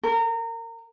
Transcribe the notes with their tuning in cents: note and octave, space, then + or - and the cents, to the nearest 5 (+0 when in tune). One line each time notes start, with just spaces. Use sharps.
A#4 -25